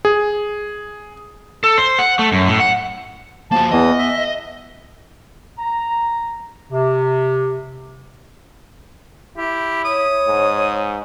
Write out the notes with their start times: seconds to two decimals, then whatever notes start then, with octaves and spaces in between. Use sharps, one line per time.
0.05 G#4
1.64 A4
1.78 C5
1.99 F#5
2.19 A3
2.32 F#2
2.48 A2
2.60 F#5
3.52 F3 A#3 F#4 A5
3.71 E2 E3 B3 D#5
3.98 E5
5.58 A#5
6.71 C3
9.37 E4 G4
9.85 C#5 D#6
10.28 G#2